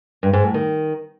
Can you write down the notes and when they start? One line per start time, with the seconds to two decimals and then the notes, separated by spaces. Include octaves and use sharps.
0.23 G2
0.33 G#2
0.44 A2
0.54 D#3